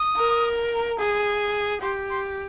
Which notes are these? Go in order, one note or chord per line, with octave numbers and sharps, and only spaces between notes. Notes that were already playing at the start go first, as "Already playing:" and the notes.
Already playing: D#6
A#4
G#4
G4 C6
C6